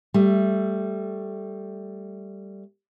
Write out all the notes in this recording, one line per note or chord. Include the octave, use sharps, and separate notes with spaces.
G3 A3